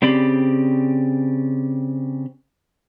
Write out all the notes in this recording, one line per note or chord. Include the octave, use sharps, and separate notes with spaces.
C#3 C4 G4 D5 B5